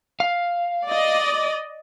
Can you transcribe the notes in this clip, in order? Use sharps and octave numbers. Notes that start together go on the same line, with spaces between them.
F5
D5 D#5